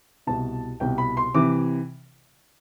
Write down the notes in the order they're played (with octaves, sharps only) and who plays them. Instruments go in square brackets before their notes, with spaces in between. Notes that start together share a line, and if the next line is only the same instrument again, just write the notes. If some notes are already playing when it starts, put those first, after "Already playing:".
[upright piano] C2 B2 A5
C2 B2 G5
B5
C6
C3 E3 D6